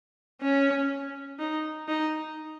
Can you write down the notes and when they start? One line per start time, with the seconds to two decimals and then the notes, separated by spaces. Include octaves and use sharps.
0.41 C#4
1.39 D#4
1.88 D#4